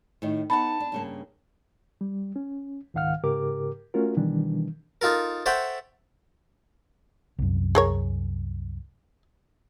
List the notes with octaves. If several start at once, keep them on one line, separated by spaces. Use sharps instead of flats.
A2 D#3
B3 D#4 F#5 A5 B5
D4
G2 C#3 A#3
G3
C#4
C#2 G#2 D#3 F5 F#5 F6
G#2 C#3 G4 A#4 D6
A3 C#4 F4 F#4 A#4
B2 D#3 E3 G3 D4
D#4 F4 A4 A#4
A4 C5 C#5 E5 F#5 G5
C2 F#2
G#4 A#4 C#5